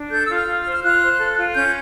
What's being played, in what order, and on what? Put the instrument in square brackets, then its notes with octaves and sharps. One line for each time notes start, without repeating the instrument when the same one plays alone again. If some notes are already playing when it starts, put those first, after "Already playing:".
Already playing: [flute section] D4
A4 G6
F4 E6
F6
F4
F6
C5
F6
F4 F#6
C5
A4
F4
C#4 G6